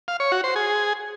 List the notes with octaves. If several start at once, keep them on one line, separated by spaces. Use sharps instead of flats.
F5
C#5
F#4
C5
G#4